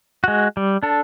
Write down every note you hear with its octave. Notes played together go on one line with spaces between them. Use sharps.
G#3 F#4
G3
D4 A4